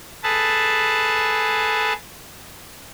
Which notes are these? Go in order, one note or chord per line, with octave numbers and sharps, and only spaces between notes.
G#4 A4 B4 A5